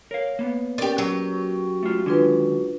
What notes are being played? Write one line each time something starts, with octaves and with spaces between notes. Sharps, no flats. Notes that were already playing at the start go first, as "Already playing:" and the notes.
A#4 C#5 F5
A#3 B3
C#4 G4 A#4 D5
F#3 G4
A3 F4
D3 D#3 G#3 D4 F4 B4